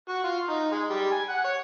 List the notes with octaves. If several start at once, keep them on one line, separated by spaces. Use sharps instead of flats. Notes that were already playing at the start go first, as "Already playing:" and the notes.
F#4
F4
D#4
G#3
G3
G#5
F#5
C#5